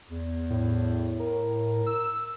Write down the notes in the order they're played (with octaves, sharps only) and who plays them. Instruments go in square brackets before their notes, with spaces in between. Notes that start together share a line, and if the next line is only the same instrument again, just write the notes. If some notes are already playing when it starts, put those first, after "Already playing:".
[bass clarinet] E2
[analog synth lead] A2
[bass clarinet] A#4
[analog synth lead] E6